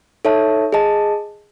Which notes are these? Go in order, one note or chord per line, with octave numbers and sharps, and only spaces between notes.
D#4 A4 C#5 E5 A5
G#4 D#5 A5